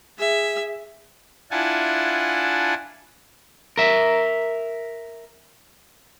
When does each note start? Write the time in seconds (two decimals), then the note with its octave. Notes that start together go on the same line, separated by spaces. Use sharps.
0.18 G#4 E5
1.51 D4 E4 F4 F#5 G#5 A5
3.77 A#4 E5